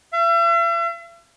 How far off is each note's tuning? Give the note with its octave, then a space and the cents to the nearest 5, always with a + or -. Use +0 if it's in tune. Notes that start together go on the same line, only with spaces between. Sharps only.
E5 +45